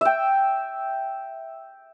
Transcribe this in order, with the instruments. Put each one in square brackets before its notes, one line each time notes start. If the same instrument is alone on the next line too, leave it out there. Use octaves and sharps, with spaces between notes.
[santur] E5 G5